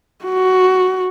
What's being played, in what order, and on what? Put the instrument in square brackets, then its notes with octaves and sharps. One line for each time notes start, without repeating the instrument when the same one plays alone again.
[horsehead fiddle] F#4